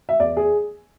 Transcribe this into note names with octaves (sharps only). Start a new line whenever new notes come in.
E5
E2 D5
G#4